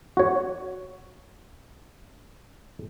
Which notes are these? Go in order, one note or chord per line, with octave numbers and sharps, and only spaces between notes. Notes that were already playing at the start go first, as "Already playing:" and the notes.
F#4 C#5